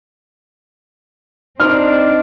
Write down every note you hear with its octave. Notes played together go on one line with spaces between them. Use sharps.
C4 D4 D#4 C5 D5 D#5 F6